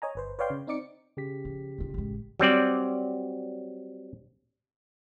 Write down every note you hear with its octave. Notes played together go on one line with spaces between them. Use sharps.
C#5 D#5 G#5 A#5
G1 B4 C5
B4 C#5 D5 F5 G5 C6
C#3
C4 D#4 D5 D6 C#7
C#3 G4 B6
F3
B2 F4
A1 G#3
F#3 G3 C4 D5